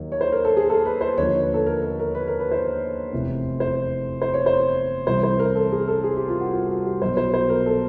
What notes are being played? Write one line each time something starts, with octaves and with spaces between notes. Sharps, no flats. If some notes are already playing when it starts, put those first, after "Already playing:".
Already playing: D#2 D#3 F#3
C#5
C5
A#4
A4
G#4
A4
B4
C5
D#2 D3 F3 C#5
B4
A4
A#4
A#4
A#4
B4
A#4
B4
C5
F1 E2 C3
C5
C5
C#5
C5
C2 C3 E3 C5
C5
A#4
A4
G#4
A4
G#4
G4
F4
F#4
F4
F#4
G4
B1 B2 F#3 C5
C5
C5
A#4
A4